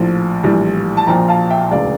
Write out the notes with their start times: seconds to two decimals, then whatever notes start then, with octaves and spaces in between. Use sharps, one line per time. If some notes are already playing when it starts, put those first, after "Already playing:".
Already playing: A#1 A2 F3
0.43 A#1 A2 E3 G3
0.97 A5
1.07 A#1 A#2 F3 G5 A#5
1.28 F5 A5
1.50 E5 G5
1.71 E1 D2 C#3 D5 F5